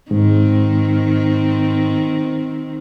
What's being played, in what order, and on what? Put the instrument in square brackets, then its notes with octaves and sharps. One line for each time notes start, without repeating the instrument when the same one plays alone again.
[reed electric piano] G#2 [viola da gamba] D#3 C4